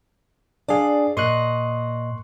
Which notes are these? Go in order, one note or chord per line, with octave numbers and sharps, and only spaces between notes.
D4 G#4 D5 F5
A#2 D#5 C6 C#6 F#6